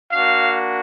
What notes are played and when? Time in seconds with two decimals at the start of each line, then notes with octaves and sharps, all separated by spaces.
0.12 A#3 D4 F#4 F5